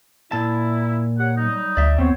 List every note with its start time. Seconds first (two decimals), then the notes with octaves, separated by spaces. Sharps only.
0.32 A#2 E4 A5
1.19 G4 C#5 F#5
1.37 F#3 G3 D#4
1.77 D2 D5 E5
1.98 D#2 B3 C4 C5 C#5